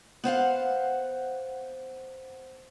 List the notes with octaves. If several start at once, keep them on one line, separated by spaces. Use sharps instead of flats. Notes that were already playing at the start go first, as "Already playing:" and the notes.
B3 C5 F5 F#5